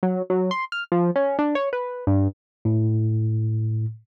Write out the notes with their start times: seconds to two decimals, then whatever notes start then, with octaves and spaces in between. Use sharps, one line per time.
0.03 F#3
0.30 F#3
0.51 C6
0.72 F6
0.92 F3
1.16 C#4
1.39 D4
1.55 C#5
1.73 B4
2.07 G2
2.65 A2